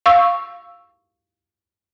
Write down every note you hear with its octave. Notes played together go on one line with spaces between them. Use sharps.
F5 C#6 E6